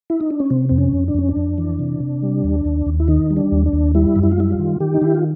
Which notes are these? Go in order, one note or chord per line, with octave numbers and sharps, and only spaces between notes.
E4
D#4
D4
C#4
C3 C4
F2 C4
C#4
F2
D4
F2 C#4
D4
F2
E3
C3
C3
G3
D#2
D#2
D#2
E4
D#3 D#4
G3
D4
D#2
D4
D#2
G3 E4
F#2
E4
F4
G3 E4
F4
D#3
D#3 G4
D#4
D#3 E4
F4